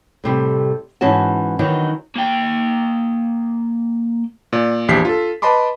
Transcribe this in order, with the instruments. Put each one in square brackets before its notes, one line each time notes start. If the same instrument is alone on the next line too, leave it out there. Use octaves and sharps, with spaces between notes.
[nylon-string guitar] A2 C3 G3
G#2 E3 C#4 F#4 A5
D#3 E3 F#3 B3 D4 D#4
[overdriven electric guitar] A#3 G5
[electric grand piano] A#2 D5
A#1 E2 G4 B6 C7
F4 A4
B4 D#5 A5 B5 C6 D6